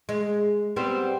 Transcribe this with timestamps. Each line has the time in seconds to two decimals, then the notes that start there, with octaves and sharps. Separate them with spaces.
0.09 G#3
0.76 G3 B3 C4